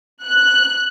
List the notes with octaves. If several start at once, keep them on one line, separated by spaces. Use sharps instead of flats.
F#6